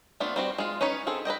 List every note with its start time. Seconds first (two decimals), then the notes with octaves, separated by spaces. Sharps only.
0.20 A3 B3 C4 D4 F4
0.36 G3 C4 F#4
0.58 G#3 F4
0.81 C#4 D#4 B4 C#5
1.07 C4 G#4 A4
1.25 B4 C5 D#5 G5